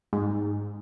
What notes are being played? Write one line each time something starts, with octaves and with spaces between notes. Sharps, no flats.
G#2